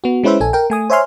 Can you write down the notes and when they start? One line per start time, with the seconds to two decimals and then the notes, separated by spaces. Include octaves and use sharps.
0.04 B3 F#4
0.24 G#3 C#4 E4 B4 C5 E5
0.41 A#1 A4 G#5
0.53 A#4 G5
0.70 A3 G#5 D#6
0.90 C5 C#5 E5 G#5 C6 F6